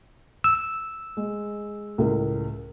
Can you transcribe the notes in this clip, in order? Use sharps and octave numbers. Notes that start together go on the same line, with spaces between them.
E6
G#3
C#2 A2 A#4